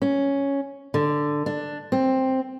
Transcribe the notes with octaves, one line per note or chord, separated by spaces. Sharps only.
C#4
D3
D4
C4